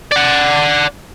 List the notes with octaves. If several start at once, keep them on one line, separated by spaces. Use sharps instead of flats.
D5 F#5